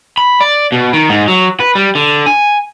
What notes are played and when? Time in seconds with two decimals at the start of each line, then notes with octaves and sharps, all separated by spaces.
0.18 B5
0.41 D5
0.72 B2
0.93 D#3
1.09 G#2
1.28 F#3
1.60 B4
1.75 G3
1.95 D3
2.26 G#5